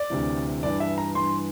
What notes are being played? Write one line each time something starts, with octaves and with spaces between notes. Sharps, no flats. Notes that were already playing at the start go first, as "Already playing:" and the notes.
Already playing: D5
D2 C3 E3
G2 E3 D5
E5
A#5
G2 E3 C6